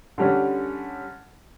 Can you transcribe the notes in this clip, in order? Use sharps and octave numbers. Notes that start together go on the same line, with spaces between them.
D3 G3 C#4